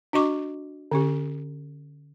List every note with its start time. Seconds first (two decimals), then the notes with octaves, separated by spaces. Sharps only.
0.13 D4 F#4 D#5 C#6 D6
0.92 D3 C#4 G4